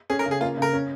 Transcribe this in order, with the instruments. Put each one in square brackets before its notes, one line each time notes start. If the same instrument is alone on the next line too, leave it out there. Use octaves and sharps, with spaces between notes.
[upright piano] C#4 [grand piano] G#4
[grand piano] A#4
[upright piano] C#3
[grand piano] G#4
[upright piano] A#3 [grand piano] F4
[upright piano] C#3 [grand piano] A#4
[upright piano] C#4